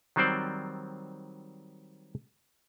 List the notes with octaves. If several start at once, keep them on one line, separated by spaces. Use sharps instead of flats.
D#3 F#3 G3 C4 C5 D5